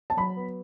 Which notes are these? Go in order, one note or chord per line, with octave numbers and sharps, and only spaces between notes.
A5
F#3 B5
B3